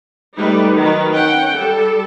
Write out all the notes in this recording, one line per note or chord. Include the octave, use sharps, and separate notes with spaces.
G3 A3 D#4 B4
D#3 F#3 B4
C#4 F#5 G5
G3 A4